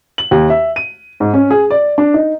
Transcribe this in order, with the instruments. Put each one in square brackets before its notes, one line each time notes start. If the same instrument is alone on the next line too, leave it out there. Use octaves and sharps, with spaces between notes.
[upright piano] F#7
D#2
E5
D#7
G#2
C#4
G#4
D5
D4
D#4